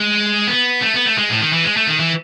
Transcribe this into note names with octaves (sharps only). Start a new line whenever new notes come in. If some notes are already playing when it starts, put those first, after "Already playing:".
Already playing: G#3
B3
A3
B3
A3
G#3
A2
D#3
E3
G#3
A3
D#3
E3